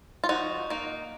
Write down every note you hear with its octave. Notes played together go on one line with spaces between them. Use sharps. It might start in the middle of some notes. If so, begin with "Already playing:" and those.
F4
F3 D#4 F#4
A#3 D#4